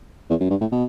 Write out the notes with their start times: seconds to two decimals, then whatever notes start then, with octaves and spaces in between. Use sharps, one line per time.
0.30 E2
0.40 F#2
0.50 G2
0.61 A2
0.72 B2